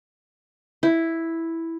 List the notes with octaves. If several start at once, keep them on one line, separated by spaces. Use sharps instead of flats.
E4